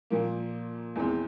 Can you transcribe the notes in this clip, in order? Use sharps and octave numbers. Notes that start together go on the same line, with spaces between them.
A#2 F3 A#3
E2 E3 G#3 C4